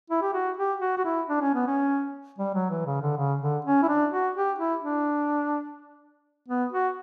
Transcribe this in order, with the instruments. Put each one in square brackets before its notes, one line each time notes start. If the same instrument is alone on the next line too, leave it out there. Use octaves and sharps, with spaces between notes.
[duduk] E4
G4
F#4
G4
F#4
F#4
E4
D4
C#4
B3
C#4
G3
F#3
E3
C#3
D3
C#3
D3
C#4
E4
D4
F#4
G4
E4
D4
B3
F#4